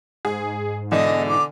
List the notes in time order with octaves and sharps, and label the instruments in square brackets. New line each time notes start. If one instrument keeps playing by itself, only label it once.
[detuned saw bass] G#2 [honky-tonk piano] G#4
[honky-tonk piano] B2 E3 [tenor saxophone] D3 [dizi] D#5
[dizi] D6